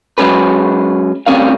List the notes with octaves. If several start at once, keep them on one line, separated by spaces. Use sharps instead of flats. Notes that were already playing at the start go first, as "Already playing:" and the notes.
F#3 G#3 C#4 G#4 B4
D2 G3 C4 C#4 A#4 F5